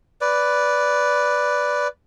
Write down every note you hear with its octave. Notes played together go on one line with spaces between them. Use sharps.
B4 D5